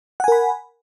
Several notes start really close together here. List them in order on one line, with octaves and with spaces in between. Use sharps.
F#5 G#5 A#4 B5